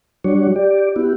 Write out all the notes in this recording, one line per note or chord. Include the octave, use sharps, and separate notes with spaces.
F#3 G3 D4 F#4 C#5
G4 D5
B3 E4 F#4 G4